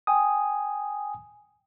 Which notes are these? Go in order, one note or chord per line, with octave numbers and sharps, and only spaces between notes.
G5 G#5 D#6